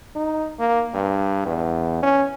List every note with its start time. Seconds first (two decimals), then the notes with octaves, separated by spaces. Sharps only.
0.16 D#4
0.59 A#3
0.94 G2
1.46 E2
2.03 C#4